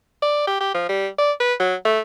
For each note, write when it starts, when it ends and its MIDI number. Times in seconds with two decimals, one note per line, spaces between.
0.22 0.44 74
0.47 0.59 67
0.61 0.70 67
0.74 0.88 53
0.89 1.07 55
1.18 1.32 74
1.40 1.53 71
1.60 1.75 54
1.85 2.00 57